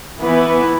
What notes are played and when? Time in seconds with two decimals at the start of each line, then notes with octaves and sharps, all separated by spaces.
0.20 E3 B3 E4 B4